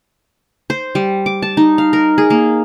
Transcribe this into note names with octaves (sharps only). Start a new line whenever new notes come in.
C5
G3
D6
A5
D#4
F5
A#4
G#4
A#3